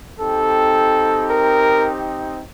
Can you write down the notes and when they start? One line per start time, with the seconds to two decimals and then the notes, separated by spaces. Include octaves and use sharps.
0.18 C4 D#4 G4 A4
1.30 A#4